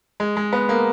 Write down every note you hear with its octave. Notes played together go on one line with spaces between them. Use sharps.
G#3
G#3
B3
A#3